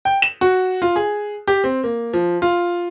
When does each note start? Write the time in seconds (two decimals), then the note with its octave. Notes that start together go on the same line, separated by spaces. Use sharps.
0.05 G5
0.22 E7
0.41 F#4
0.82 F4
0.96 G#4
1.48 G4
1.64 C4
1.84 A#3
2.13 F3
2.42 F4